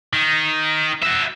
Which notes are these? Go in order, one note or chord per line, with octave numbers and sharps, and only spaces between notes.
D#3
F#4 E5